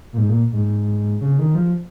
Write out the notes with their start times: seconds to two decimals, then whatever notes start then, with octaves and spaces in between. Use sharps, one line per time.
0.13 A#2
0.18 G#2
0.29 A#2
0.52 G#2
1.21 C#3
1.39 D#3
1.55 F3